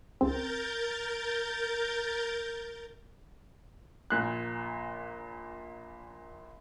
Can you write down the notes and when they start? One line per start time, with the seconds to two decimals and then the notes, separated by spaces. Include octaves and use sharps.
0.21 C#2 C4 A#4 G6 A6
4.10 A#1 A#2 F#6